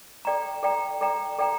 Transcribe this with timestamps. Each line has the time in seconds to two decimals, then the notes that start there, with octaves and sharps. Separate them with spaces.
0.25 A4 D5 G5 A#5
0.63 A4 D5 G5 A#5
1.01 A4 D5 G5 A#5
1.39 A4 D5 G5 A#5